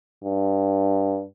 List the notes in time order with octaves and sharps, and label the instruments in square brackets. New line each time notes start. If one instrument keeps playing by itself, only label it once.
[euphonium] G2